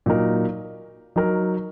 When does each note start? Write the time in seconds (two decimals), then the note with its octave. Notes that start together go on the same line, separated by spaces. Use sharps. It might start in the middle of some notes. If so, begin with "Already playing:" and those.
0.06 A#2 F#3 D#4 A#4
1.16 F#3 D#4 A#4